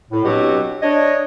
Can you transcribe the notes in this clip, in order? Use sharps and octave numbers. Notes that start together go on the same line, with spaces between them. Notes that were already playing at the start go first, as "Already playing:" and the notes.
A2
B2 F#3 C4 D4 F#4 G4
D4 C#5 D#5